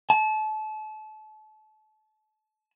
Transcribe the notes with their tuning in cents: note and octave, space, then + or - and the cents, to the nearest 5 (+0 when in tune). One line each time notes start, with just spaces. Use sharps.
A5 -30